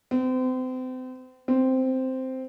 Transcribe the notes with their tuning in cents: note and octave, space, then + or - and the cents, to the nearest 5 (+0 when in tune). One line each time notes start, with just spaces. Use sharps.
C4 -35
C4 -5